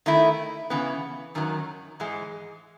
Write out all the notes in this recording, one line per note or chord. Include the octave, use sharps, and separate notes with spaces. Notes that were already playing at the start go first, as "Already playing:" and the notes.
D#3 A3 E4
C#3 E3 B3
F#2 D#3 F#3
G#2 E3 G#3